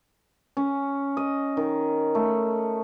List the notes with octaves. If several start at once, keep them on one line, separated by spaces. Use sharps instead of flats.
C#4
D#5
D#3
A3